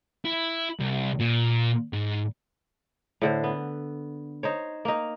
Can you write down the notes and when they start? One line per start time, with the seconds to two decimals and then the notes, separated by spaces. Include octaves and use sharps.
0.25 E4
0.79 C2
1.20 A#2
1.93 G#2
3.21 A2 D3 C5
3.44 B3
4.43 D#4 C5 C#5
4.85 A#3 D#4